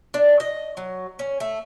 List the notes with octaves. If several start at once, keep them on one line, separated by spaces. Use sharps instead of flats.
D4
D#5
F#3
C#4
A3